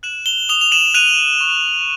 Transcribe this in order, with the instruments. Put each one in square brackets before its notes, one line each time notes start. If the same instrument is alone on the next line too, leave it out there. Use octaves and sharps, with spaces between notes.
[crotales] F#6 E7 F#7
F7 G7
D#6 F7 G7
F7
E7 F#7
F#6 D#7 F7
C#6